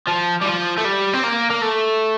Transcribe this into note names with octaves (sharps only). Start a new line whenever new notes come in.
F3
G3
F3
A3
G3
C4
A#3
A#3
A3